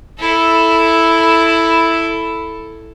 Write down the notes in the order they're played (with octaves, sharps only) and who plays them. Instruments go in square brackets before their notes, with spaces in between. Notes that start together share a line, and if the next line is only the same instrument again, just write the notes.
[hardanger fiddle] E4 A4